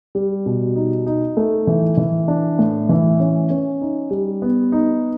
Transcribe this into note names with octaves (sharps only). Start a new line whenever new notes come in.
G3
B2
D#4
D#4
A3
E3
E3
D4
A2
E3
C#4
C#4
D#4
G3
B3
D#4